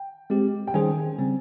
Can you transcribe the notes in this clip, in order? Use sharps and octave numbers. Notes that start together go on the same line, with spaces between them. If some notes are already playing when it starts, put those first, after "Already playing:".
Already playing: G5
G#3 C4 G4
G5
D#3 G3 C#4 G#4 C5 G#5
C#3 G3 C4